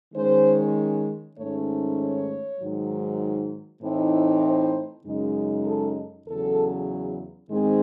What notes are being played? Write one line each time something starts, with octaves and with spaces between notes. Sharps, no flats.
D#3 G#3 C#4 C5
G#2 D#3 A3 C#4 C#5
C#5
G#2 D#3 F#3
A2 E3 C4 D#4
C5
F#2 C#3 G#3 D#4
A4
E2 C#3 F#3 A4
G#2 D#3 G#3 C4 G#4